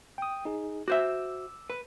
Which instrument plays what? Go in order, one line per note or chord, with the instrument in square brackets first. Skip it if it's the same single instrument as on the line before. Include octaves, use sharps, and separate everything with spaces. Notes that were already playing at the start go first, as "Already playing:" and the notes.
[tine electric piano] G5 D#6
D#4 G#4
[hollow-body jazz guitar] F#4 C5 E5 [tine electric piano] D6 E6
[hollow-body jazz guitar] B4